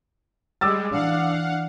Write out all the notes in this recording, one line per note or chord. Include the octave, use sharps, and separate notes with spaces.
G3 G#3 D6 E6 A6
E3 D4 F5 F#5